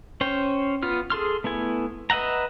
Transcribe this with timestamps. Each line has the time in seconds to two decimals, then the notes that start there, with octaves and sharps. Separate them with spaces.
0.21 C#4 C5 C#5 G5
0.83 B3 F4 F6
1.10 G#4 A4 C6 F6
1.44 A3 B3 E4 G#5
2.10 B4 D#5 E5 F#5 A#5